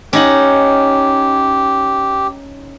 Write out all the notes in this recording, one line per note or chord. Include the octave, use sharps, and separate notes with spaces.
C#4 D#4 G4 F#5